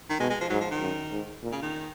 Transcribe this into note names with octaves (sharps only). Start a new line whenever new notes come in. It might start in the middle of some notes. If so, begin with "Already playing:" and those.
D#3
B2 G#3
G#3
F3
G#2 F#3
F3
D#3
F#2
G#2
A#2
C#3
D#3